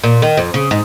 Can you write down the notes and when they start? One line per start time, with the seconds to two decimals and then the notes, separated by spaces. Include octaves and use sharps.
0.04 A#2
0.22 D#3
0.37 F2
0.54 C#3
0.71 G#2